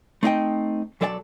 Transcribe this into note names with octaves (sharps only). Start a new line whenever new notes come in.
A3 C4 D#4 G#4 D#5 G5
B1 F#3 A4 D5 E5 A5